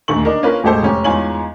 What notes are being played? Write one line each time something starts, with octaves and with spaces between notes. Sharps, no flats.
D#1 D2 D3 D#3 C#6 F#7
D4 D#4 A#4
A#3 C#4 F4 A#4 B4
E1 A1 G#3 G4 A4 C5
F1 C#4 G4
E2 G#2 F4 C#5 G#5 F#7